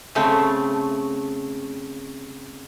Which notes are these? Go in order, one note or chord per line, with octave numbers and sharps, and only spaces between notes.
C#3 A3 C4